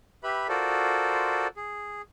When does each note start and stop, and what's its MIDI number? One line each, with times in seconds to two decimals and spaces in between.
0.23 0.48 67
0.23 0.48 71
0.23 0.48 76
0.23 0.48 83
0.49 1.47 65
0.49 1.47 66
0.49 1.47 69
0.49 1.47 70
0.49 1.47 72
0.49 1.47 74
1.57 2.02 68